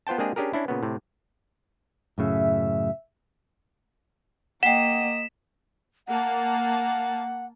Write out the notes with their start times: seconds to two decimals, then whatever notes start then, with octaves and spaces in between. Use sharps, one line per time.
0.07 B3 F4 C5 G5 A5
0.18 G#3 A#3 C4 D4 G4 G#4
0.36 C#4 D4 G4 G#4 A#4
0.53 C#4 D4 E4
0.68 A#2 C#3 B3
0.83 A2 C3
2.18 F#2 A2 C#3 E5
4.63 A#3 D#5 F#5 G5 B6 E7
6.08 A#3 F#5 A5